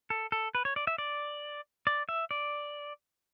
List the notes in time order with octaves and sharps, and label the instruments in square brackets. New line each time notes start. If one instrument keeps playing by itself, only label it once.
[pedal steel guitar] A4
A4
B4
C#5
D5
E5
D5
D5
E5
D5